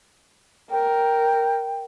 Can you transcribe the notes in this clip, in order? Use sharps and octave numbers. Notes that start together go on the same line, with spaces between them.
A#4 G5